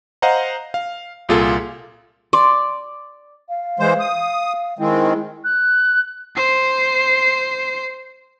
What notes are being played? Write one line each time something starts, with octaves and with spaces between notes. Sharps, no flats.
C5 D#5 F5 F#5 A#5
F5
C2 A#2 F4 G#4 A4
D5 C6
F5
E3 G#3 C5
D#6
D#3 G#3 C4 E4
F#6
C5 C7